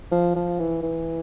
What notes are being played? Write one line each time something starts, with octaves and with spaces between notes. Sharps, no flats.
F3
F3
E3
E3